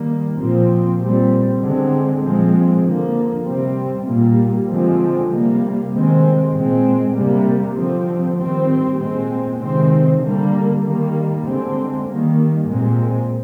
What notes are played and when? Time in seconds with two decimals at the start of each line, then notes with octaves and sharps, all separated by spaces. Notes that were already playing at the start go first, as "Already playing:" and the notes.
Already playing: D#3 G3 A#3
0.39 A#2 F3 C4
1.01 A#2 G3 C4
1.62 D3 G#3 C4
2.23 A#2 F3 G#3 C4
2.85 D3 F3 A#3
3.47 C3 G3 C4
4.07 A#2 G3 A#3
4.69 D3 F3 G#3 C4
5.31 C3 G3 A#3
5.92 C3 D#3 G#3 C4
6.54 A#2 G#3 C4
7.15 C3 G3 A#3
7.77 D3 F3 C4
8.38 D#3 G3 C4
8.99 A#2 G#3 C4
9.61 C3 D#3 G#3 C4
10.22 D3 G3 A#3
10.83 D#3 G3 A#3
11.44 D3 G#3 C4
12.06 D#3 G3 A#3
12.68 A#2 G#3 C4